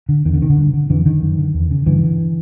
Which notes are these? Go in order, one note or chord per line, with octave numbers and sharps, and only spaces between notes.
D3
E2 D#3
D3
C3 D#3
D3
G2
D3
F2 D3 E3
D3 D#3
F#2
D3
E2
C#3
G2 D3 E3
D3